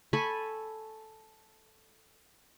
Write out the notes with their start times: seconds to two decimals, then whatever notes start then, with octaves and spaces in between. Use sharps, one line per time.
0.13 A4 G#5 B5 C#6